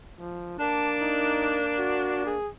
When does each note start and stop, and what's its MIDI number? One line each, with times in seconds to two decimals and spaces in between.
0.19 0.55 53
0.59 2.35 58
0.59 2.35 62
0.59 0.89 81
1.01 1.61 63
1.78 2.26 66
2.26 2.49 68